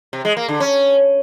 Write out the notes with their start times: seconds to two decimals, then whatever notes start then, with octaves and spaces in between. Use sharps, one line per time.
0.13 C3
0.25 G#3
0.37 A#3
0.48 D3
0.60 C#4